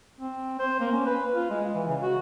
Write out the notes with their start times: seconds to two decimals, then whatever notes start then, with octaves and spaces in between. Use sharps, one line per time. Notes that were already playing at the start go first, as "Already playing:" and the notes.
0.20 C4
0.59 C5
0.80 A#3
0.92 C#4
1.05 B4
1.33 F4
1.50 G#3
1.74 E3
1.88 C#3
2.02 F#4